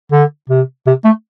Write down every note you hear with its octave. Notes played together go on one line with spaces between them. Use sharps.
D3
C3
C3
A3